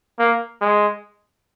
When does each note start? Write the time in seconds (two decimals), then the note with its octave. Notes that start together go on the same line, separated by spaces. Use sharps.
0.19 A#3
0.61 G#3